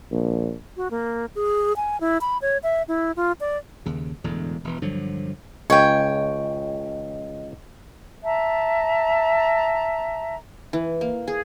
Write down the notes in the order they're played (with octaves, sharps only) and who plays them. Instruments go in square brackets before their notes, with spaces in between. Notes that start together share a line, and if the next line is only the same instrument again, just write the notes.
[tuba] A#1
[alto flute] F#4
A#3
G#4
G#5
E4
B5
C#5
E5
E4
F4
D5
[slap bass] D#2 C#3
E1 E2 A2 D3
E1 E3
G2 D3 F3 F#3
[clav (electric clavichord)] C#2 [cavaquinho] C#5 G5 [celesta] D#5
[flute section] E5 A5 A#5
[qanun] E3
A#3
G#4